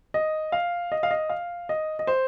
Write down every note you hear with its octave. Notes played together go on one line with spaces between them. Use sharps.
D#5
F5
D#5
F5
D#5
F5
D#5
D#5
C5